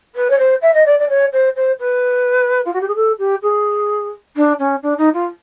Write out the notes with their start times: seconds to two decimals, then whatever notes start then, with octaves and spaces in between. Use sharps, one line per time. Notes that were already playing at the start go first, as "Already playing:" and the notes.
0.15 B4
0.30 C#5
0.38 C5
0.61 E5
0.73 D#5
0.85 D5
0.99 D5
1.09 C#5
1.32 C5
1.55 C5
1.79 B4
2.65 F4
2.73 F#4
2.80 G4
2.87 G#4
2.95 A4
3.18 G4
3.42 G#4
4.36 D4
4.59 C#4
4.82 D4
4.97 D#4
5.13 F4